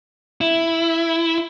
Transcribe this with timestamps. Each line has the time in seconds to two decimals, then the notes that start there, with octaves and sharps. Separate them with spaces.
0.41 E4